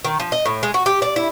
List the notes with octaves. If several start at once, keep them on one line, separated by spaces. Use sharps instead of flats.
D#3
F3
D#5
A2
G#3
F#4
G4
D5
E4